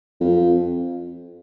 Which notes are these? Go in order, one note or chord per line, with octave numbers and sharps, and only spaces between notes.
F2